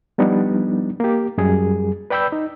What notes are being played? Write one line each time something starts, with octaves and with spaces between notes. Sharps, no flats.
F3 G3 B3 D4 D#4
A#3 G4
F#2 G3 G#4
B4 D5 G5 B5 E6 G6
D#4